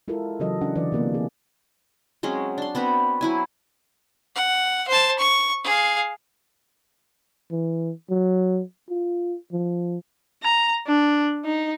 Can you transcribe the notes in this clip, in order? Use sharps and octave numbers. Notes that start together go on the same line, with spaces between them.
G#3 E4 F4 A4 A#4
C#3 E3 F#3 A4 D#5
C#3 C#4 D4 F#5
D3 E3 D5
C3 A#3 B3
G#4
F#3 G#3 C4 C#4
D4 C6
B3 C4 F#4 B4
F#3 E4 G#5
F#5
C5 A5
C#6
G#4 F5
E3
F#3
F4
F3
A#5
D4
D#4